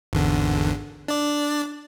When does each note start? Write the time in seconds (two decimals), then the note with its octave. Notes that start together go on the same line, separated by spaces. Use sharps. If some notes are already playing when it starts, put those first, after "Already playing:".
0.13 G#1 E2 D3
1.08 D4 D5